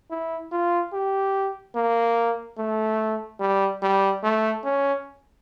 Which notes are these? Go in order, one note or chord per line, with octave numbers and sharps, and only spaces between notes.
E4
F4
G4
A#3
A3
G3
G3
A3
C#4